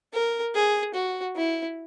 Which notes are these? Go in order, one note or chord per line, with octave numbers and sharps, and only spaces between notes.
A#4
G#4
F#4
E4